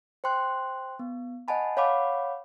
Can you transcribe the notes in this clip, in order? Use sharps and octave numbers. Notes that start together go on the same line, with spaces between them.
C5 G5 C6 F#6
B3
D#5 F#5 G#5 A5 B5
C#5 F5 F#5 B5 D6